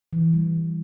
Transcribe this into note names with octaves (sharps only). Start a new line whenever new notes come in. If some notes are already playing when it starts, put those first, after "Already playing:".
E3
G3